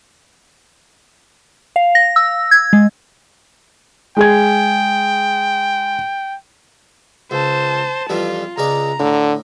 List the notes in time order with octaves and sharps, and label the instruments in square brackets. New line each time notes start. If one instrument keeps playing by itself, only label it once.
[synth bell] F5
A#6
E6
G#6
G#3
[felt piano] G#3 G#4 G#6 [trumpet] G5
[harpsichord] C#2 [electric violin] C5 A5
[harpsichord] F2 E3 G3 [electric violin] F4
[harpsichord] C#2 G#3 D5 [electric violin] A#5
[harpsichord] A2 [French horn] D3